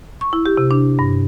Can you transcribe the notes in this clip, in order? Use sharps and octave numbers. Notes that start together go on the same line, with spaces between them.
C#6
E4
G4
C3
D4
G2